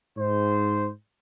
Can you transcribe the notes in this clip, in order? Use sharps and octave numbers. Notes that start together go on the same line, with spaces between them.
G#2 C5